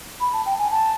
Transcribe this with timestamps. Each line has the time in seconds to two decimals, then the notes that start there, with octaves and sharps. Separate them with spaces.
0.20 B5
0.33 A5
0.46 G5
0.59 G#5
0.71 A5